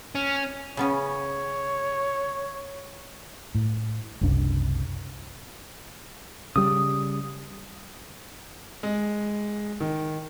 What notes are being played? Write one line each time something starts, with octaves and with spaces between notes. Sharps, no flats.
C#4
C#3 B3 C#4 C#5
A2
F#1 C2 C#3 D4
C#3 G3 D#6
G#3
D#3